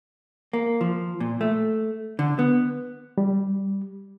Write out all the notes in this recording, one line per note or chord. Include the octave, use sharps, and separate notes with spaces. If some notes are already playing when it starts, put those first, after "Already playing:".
A#3
F3
A#2
A3
D3
B3
G3